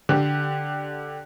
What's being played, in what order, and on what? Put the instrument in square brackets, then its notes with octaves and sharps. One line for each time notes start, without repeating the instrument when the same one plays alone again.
[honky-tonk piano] D3 G4